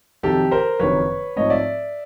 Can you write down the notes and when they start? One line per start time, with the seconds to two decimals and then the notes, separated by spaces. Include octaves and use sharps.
0.23 F2 C3 D#3 F#3 G4 A4
0.51 A#4 C5
0.79 F#1 F2 C3 D#3 F#3 B4 C#5
1.36 G#2 F3 A3 C4 C#5 D#5
1.50 D5 E5